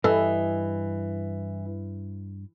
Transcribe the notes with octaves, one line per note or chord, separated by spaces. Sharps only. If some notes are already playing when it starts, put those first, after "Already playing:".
G2 E3 A4 D#5